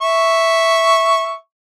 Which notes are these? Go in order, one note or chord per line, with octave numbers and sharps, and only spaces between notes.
E5 C#6